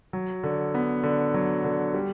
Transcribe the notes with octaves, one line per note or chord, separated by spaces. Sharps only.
F#3
D3
B3
D3
F#3
D3
G3